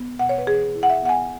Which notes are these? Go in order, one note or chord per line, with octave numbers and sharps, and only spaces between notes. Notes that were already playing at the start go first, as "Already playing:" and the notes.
Already playing: B3
B2 F#5
C#5
B4
E3 G#4
E4
F#5
E5
B3 F#5
G#5